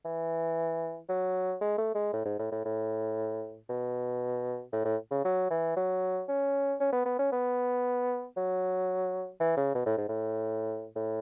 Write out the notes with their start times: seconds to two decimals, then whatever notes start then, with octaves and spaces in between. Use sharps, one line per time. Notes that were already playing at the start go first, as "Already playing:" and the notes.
0.05 E3
1.09 F#3
1.61 G#3
1.78 A3
1.95 G#3
2.13 A2
2.25 G#2
2.39 A2
2.51 A2
2.65 A2
3.69 B2
4.72 A2
4.85 A2
5.11 C#3
5.24 F#3
5.50 E3
5.76 F#3
6.28 C#4
6.80 C#4
6.93 B3
7.06 B3
7.19 C#4
7.32 B3
8.37 F#3
9.40 E3
9.57 C#3
9.75 B2
9.86 A2
9.97 G#2
10.09 A2
10.96 A2